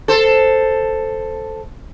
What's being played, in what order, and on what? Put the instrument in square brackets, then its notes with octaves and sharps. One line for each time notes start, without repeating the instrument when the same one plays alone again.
[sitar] A4 C5